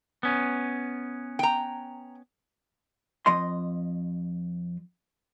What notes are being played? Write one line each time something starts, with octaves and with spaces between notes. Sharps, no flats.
B3 C#4
G5 A#5
F2 D#5 C6